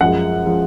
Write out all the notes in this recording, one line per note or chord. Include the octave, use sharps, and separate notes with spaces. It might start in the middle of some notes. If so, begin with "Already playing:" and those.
F#2 F3 G#3 F#5
F3 G#3